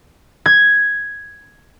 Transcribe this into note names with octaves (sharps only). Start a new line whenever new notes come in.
G#6